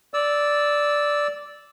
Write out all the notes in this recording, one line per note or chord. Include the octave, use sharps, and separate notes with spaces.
D5 E6